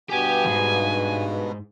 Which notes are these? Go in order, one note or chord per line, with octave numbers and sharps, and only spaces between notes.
G2 B2 B3 G4 G5 G#5
E2 G#2